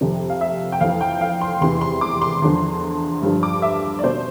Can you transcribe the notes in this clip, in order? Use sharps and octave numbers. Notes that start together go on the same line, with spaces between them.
F2 C3 F3
F5
E5
G5
F2 E3 F5
G5
F5
C6
E2 C3 E3 C6
C6
D6
C6
E2 D3 F3
G2 D3 F3
D6
E5
D5
B2 C5